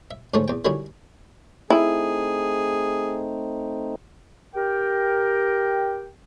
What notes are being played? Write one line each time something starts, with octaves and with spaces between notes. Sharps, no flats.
E5
G#2 D3 F3 A3 C#4
E2 G5
D3 D#3 F#3 G3 C#4 E4
A3 C4 D#4 E4 G#4
G4 A#4 G5